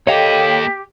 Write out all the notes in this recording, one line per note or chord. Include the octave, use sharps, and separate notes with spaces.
A#3 G4 A4 C#5 D#5 F5 G5